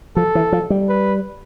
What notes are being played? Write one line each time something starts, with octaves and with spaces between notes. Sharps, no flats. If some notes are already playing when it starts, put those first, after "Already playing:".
F3 A4
E3
F3
G3
B4